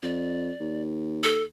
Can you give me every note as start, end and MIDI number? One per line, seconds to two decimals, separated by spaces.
0.03 0.51 41
0.03 0.82 74
0.60 1.46 39
1.23 1.43 69